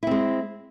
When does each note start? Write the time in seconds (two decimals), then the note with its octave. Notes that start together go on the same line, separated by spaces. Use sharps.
0.03 E4
0.07 C4
0.11 G#3